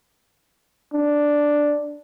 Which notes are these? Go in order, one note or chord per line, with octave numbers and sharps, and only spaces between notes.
D4